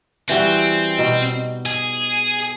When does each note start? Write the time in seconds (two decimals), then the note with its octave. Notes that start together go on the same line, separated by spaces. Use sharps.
0.29 E3 G3 C4 F#4
0.98 B2 D#4
1.66 G#4